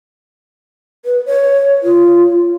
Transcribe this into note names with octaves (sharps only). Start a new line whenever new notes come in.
B4
C#5
F4